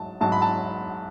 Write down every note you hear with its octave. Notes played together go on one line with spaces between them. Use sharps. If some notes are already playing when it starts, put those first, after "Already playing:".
Already playing: G#2 F#3 A5
G#2 F#3 A5
B5
A5